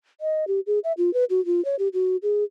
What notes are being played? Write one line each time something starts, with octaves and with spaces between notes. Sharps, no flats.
D#5
G4
G#4
E5
F4
B4
F#4
F4
C#5
G4
F#4
G#4